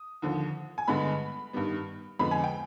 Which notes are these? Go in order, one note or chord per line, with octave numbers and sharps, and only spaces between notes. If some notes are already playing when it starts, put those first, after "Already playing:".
Already playing: D#6
D#2 D3 F3
G#5
G2 D3 G#3 B3 B5
G2 D#3 G3 B3
F2 D3 G#3 B3 B5
G#5
G5